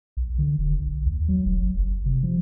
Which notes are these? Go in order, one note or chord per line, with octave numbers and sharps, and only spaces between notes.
B1
D3
E1
B1
D#2
F#3
E1
G1
F#1
C3
F3